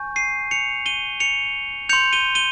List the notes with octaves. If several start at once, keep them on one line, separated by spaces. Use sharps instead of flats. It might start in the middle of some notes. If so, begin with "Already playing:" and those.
Already playing: G#5 C#6 G6
C7 D#7
C#7 F7
D#7 G7
C#7 F7
C6 G6 C#7 F7
D#7 G7
D#7 G7